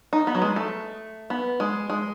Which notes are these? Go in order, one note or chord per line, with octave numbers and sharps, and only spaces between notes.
D#4
B3
F#3
G#3
A3
B3
G#3
G#3